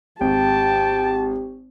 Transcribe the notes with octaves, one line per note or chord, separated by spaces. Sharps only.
G#1 G4 G5 A5